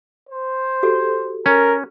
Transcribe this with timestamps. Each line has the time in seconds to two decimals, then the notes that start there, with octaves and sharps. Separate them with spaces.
0.30 C5
0.83 F#4 G4 A4
1.46 C#4 A#4